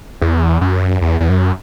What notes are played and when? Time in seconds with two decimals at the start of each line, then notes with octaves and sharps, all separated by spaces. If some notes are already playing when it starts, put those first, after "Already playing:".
0.22 E2
0.61 F#2
1.01 E2
1.21 E2
1.29 F#2